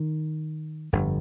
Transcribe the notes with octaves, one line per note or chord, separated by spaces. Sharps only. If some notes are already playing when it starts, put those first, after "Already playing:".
Already playing: D#3
G1 F2 D3